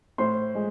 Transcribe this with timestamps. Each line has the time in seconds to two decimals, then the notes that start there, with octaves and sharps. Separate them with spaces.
0.18 A2 C5 C6
0.55 G#3